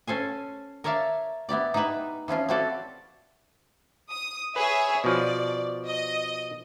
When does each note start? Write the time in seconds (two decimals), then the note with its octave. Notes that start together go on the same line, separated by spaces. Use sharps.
0.07 C#4 A4 C5 G#5
0.84 A#4 C#5 D5 E5 F5 A5
1.49 B3 E4 G4 D5
1.74 D#4 E4 G4 B4 E5
2.28 E3 F3 C#4 F4
2.49 C4 E4 F#4 G4 A4 D5
4.11 D#6
4.56 G#4 B4 C#5 E5
5.04 B2 F3 D5
5.86 D#5